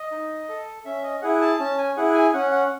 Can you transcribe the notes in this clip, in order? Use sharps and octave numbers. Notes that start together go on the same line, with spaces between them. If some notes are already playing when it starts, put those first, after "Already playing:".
Already playing: D#5
D#4
A4
C#4 E5
D#5
E4 G#4 F#5
A5
C#4 A5
G#5
E4 G#4 F#5
G#5
C#4 F#5
F#5